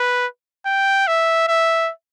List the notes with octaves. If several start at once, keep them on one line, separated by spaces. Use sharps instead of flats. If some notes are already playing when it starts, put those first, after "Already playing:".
Already playing: B4
G5
E5
E5